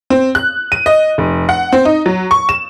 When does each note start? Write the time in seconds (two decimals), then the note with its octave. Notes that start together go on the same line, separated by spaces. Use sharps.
0.10 C4
0.35 F#6
0.72 D#7
0.86 D#5
1.18 F1
1.49 F#5
1.73 C4
1.85 D#4
2.06 F#3
2.31 C#6
2.49 E7